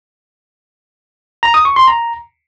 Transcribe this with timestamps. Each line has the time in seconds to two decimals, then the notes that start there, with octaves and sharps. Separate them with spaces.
1.43 A#5
1.54 D#6
1.65 C#6
1.76 C6
1.88 A#5